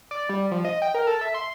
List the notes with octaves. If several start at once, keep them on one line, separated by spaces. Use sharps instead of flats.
D5
G3
F3
D#5
G5
A#4
A4
E5
C6